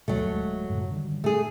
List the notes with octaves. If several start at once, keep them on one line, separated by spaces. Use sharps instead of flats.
D2 G2 B2 F#3 A3
D1 C#2 G#3
F#2 A2 C#3
D3 D#3 G3
A#2 A3 G#4